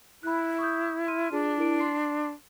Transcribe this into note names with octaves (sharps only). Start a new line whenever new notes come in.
E4 B5 F#6
C#6 D#6 G6
C6 F6 D#7
D4 F4 G#4
E4 A#4 D7
C6 C7